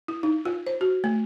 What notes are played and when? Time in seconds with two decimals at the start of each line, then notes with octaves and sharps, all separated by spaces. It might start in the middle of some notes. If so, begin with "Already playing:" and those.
0.08 E4
0.23 D#4
0.45 F4
0.67 C5
0.81 F#4
1.04 A3